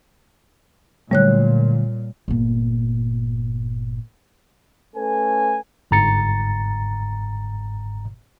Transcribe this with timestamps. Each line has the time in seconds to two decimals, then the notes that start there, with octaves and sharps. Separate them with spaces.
1.11 A#2 D3 F#3 G3 A3 C#5 F#6
2.28 G1 A#2
4.96 A3 C#4 A4 B4 G#5
5.91 G1 G#2 A#5 A6 C#7